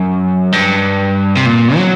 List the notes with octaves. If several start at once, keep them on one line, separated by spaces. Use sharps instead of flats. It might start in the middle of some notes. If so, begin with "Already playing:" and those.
Already playing: F#2
G2
C3
A#2
F#3